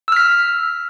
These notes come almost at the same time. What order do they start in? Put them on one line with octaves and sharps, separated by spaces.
E6 F6 B6